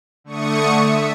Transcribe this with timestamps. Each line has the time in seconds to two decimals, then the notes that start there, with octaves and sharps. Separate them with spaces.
0.24 D3 A3 C#6 D#6 C#7
0.78 E5